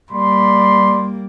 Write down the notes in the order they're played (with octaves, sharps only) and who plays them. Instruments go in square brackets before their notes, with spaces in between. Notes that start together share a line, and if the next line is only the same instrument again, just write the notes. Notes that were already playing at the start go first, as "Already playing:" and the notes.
[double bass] G3 A#3 [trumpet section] D5 B5 C6